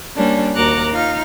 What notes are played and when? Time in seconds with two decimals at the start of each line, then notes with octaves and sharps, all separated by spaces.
0.16 G3 A#3 C#4 D4
0.56 D#2 F#4 A#4 A#5 D6 F#6
0.92 D#4 F4 F6